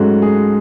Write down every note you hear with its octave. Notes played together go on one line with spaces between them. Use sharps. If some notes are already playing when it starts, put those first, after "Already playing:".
Already playing: G#2 F#3 A3 C#4 F#4
G#4